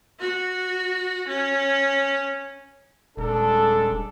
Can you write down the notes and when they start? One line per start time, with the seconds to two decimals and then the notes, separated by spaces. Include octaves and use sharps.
0.20 F#4
1.28 C#4
3.17 D#1 G#3 D4 A4